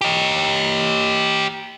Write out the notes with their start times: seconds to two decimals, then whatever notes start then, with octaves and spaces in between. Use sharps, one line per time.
0.01 G4 D#5